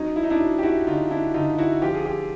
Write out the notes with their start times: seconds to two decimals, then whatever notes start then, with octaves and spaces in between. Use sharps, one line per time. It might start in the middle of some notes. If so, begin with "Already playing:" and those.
Already playing: F#3 C#4 D#4
0.16 E4
0.23 D#4
0.30 D4 E4
0.40 F#3
0.59 G4
0.63 E4 F#4
0.87 D3 D#4 F4
1.11 D4 E4
1.34 D3 D#4 F4
1.58 E4 F#4
1.82 F3 F4 G4
1.94 G#4
2.05 F4 G4